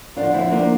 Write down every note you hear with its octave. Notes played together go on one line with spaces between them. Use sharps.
F2 D3 F3 D4 F4
C4 E4
A#3 D4